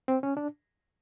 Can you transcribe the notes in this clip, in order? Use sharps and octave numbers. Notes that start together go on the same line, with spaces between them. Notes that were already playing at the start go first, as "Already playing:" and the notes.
C4
C#4
D4